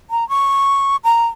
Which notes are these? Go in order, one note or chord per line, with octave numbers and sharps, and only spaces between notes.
A#5
C#6
A#5